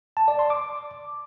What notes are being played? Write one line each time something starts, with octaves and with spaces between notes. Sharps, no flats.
A5
D5
C6
D6